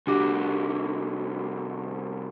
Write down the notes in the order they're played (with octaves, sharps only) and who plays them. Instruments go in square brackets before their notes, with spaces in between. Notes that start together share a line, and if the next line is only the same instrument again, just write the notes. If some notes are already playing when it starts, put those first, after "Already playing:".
[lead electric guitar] C2 F#4 [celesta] D4 G4 D6